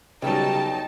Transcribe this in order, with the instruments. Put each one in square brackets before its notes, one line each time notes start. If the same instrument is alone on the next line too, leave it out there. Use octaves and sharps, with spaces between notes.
[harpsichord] B1 F#3 [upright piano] C#3 G3 [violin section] D#4 A5 [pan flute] G5